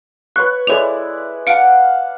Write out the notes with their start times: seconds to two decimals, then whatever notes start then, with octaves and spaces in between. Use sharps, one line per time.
0.36 B4 C#5 C#6 F#6
0.67 G#3 E4 A4 C#5 D5 F7
1.47 F5 F#5 A5 C#7 D7